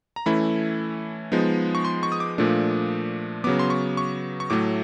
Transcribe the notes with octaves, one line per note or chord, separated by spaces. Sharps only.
A#5
E3 A3 C#4 E4 B5
F3 G#3 B3 D#4
C#6
C6
C#6
D#6
D6
A#2 F3 A3 D4
C#3 F#3 B3 D6
C6
C#6
C#6
C#6
A2 F#3 A3 D6